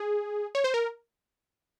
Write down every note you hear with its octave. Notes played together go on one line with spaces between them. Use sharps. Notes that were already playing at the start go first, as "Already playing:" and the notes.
Already playing: G#4
C#5
C5
A#4